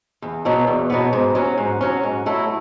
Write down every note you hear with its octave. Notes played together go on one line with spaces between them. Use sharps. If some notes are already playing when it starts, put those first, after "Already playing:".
E2
B2 F#3 B3
E2
B2 F#3 B3
G#2
F#3 C#4
G#2
F#3 C#4
G#2
F#3 A3 E4